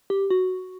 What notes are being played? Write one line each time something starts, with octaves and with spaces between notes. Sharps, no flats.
G4
F#4